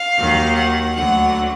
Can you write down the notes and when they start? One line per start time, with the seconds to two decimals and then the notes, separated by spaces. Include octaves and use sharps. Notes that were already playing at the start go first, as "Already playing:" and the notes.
Already playing: F5
0.17 D#2 D#3 F#3
0.56 F#5
0.95 D2 D3 F#3 F#5